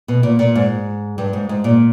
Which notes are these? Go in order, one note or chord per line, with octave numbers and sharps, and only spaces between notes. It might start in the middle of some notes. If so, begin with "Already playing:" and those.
B2
A#2
A#2
G#2
G2
G#2
G#2
A#2